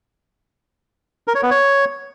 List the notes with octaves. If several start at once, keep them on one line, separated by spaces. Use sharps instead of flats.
A#4
C#5
B3
C#5